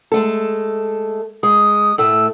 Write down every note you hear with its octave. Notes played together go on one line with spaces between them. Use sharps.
G#3 A3 A4
G#3 D#6
A2 A3 E6